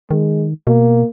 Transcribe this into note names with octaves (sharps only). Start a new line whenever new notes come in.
D#3 G#3
B2 A#3